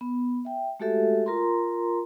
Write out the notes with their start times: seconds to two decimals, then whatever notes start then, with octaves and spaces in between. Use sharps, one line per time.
0.01 B3
0.45 E5 G5
0.80 G#3 A3 F#4 G4 A4 E5
1.26 F4 A#4 A#5 C6